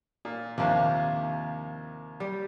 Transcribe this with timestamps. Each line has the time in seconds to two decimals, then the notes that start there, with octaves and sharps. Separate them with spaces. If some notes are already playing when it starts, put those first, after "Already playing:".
0.25 A#2
0.58 D#2 C3 F3 A#3 D4
2.20 G3